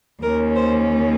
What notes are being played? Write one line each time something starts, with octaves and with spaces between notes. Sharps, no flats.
D#2 D#3 A#3 C#4 A#4
C5